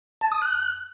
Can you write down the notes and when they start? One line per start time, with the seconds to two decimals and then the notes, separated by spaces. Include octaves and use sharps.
0.21 A5
0.31 D#6
0.42 F#6